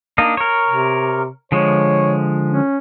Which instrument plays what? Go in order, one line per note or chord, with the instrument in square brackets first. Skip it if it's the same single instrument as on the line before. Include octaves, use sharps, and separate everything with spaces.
[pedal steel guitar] A#3 D4 D#4
A#4 C#5
[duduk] C3
[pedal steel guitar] D3 F3 G#3 [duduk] C#5
[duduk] C#4